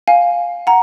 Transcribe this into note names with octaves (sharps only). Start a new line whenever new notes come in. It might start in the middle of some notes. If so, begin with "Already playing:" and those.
F5 G#5
F#5 A#5